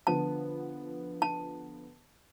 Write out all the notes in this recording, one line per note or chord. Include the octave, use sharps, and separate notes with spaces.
D3 F3 B3 A5
A5